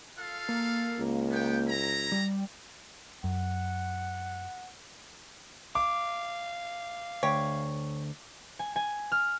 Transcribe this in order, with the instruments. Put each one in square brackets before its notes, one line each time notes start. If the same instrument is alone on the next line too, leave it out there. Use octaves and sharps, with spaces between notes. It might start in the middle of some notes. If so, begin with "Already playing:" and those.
[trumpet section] F4 A4 F5
[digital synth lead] A#3
[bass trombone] C#2
[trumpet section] B3 G5
E4 A#5
[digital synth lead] G3
[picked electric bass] F#2 [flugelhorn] F#5
[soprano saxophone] F5 [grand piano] D6
[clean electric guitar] D2 [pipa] G4 C#5
[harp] G#5
G#5
F6